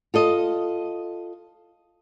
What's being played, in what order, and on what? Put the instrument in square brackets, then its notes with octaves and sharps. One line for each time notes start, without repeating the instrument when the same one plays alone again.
[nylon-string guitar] F4 A4 D#5